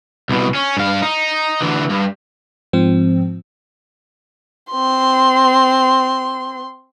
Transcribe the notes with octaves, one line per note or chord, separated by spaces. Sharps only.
C2 B2
C#4
G2 F5
D#4
D2 E3
G2
G#2 F3 C4
C4 C6